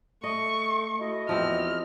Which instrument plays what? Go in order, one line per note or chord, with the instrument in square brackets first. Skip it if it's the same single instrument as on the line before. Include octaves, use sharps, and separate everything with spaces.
[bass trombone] A3 [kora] D#5 [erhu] C#6
[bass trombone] A3 [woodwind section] E4 F#4 D#5
[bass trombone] E2 [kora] F3 C4 [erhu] F6